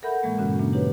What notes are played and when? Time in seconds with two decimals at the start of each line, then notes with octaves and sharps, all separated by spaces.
0.03 A4 A#4 E5 F#5 B5 G6
0.23 A2 E3 G#3 A#3
0.38 G2 A#2 C#3 C#4 F#4
0.59 E3 A#3 D4
0.73 D#4 G4 B4 C#5